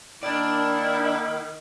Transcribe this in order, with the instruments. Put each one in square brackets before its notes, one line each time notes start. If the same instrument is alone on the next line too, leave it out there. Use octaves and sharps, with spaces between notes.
[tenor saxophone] D#3 [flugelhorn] A#3 [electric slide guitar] D4 D5 [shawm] E4